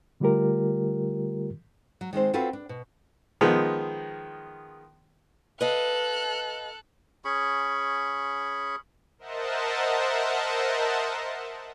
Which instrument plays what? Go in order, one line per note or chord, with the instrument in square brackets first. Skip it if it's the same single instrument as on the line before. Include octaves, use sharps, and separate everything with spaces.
[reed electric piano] D3 G3 A3 F4 G4 A#4
[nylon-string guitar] F#3
D#3 G#3 C4 C5
C4 F4 F#4 A4 B4
D4
B2
[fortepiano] D#3 F3 G#3 B3
[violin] A4 F#6 [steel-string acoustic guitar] B4 D#5 F5
[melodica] C#4 G#4 B5 C#6
[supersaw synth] A#4 C5 D#5 E5 F#5 A5